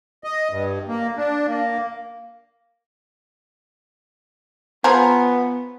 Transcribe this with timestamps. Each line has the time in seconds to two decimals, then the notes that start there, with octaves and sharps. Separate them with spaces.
0.24 D#5
0.51 G2
0.88 A#3
1.17 D4
1.47 A#3
4.84 F3 B3 G#4 A#4